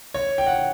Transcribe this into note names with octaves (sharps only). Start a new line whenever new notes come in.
C#5
G5
F#5